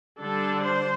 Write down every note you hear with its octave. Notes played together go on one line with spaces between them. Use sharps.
D3 G3 D4 A4
C5